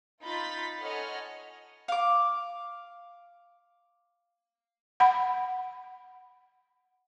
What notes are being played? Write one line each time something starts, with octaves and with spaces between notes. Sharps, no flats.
D#4 F4 B5 G6 A6 B6
A4 C#5 D#5 F#5 G#5 F6
F5 D6
F#5 B5